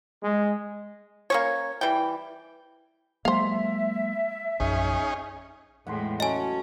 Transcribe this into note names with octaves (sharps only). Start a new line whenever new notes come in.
G#3
A#3 C#4 C#5
E3 G3 G5
F#3 G#3 A#3 C5 E5 F5
A#1 F#2 C#4 D#4 G#4
E2 A2 G#3 F#5 G5 C6
F#3 C#4 A4 D#5 G#5